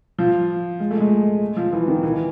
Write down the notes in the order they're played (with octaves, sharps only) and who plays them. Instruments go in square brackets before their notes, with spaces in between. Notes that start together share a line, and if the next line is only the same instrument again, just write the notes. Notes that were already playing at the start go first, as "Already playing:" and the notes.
[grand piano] F3
G#3
A3
G#3
F3
E3
D#3
E3